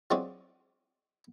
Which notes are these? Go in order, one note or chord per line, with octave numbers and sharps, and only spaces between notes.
F#3 G#3 C4 D4 F4 F#4